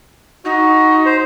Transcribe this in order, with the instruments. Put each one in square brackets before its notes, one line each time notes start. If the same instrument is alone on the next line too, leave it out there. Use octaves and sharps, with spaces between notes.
[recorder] D#4 [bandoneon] F#4
[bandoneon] C5